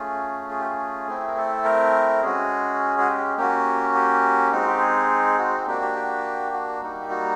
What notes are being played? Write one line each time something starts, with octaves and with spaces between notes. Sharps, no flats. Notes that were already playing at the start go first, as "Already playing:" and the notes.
Already playing: A3 C#4 F4 G#4
G#4
G4
G#4
A3 C4 E4
A#4
A4
A#4
G#3 C#4 F#4 G#4
F#4
G4
A#3 C#4 F#4 G4
G4
G#3 C4 D#4 F#4
G4
G#4
F#4
A#3 D4 F#4 G4
G4
G4
F#4
G3 A#3 D#4
G4
F#4